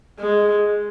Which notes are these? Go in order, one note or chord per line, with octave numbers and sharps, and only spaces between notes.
G#3